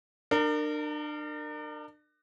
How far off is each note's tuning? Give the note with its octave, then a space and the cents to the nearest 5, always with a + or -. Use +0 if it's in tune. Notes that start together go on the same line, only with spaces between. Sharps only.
D4 +35 A#4 -20